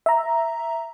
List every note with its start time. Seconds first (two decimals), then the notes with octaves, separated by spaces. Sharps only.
0.06 E5 A#5